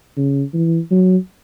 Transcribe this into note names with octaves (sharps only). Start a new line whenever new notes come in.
C#3
E3
F#3